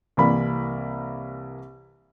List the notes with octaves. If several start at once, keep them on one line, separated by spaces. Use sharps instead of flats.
C2 E3 A#3 B5